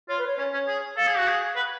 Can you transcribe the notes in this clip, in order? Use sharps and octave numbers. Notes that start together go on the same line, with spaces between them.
F4 C#5
B4
C#5
C#4 C#5
C#4
G#4
A4 F5
G#4
F#4
G#4
B4 F#5